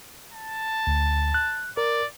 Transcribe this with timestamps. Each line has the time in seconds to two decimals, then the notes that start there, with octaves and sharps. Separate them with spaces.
0.33 A5
0.87 D2
1.34 F#6
1.77 A#4 D5